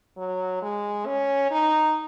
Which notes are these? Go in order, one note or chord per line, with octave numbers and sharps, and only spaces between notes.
F#3
G#3
C#4
D#4